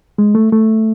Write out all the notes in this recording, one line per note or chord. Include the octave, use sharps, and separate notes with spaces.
G#3
A3
A3